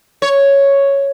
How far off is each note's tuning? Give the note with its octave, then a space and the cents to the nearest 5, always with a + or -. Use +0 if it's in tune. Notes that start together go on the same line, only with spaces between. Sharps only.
C#5 +0